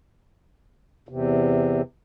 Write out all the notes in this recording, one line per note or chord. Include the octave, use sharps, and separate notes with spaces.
E2 C3